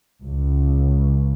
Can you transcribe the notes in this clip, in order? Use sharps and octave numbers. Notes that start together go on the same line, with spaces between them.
C#2